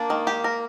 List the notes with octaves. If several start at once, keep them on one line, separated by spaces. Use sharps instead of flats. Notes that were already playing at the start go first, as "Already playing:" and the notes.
Already playing: A#3 D4
D#3
G4
A#4